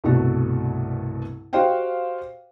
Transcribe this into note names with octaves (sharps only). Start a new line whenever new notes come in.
C2 G2 B2 A3 F#4 A4
F#4 G4 C5 D#5 F5 G5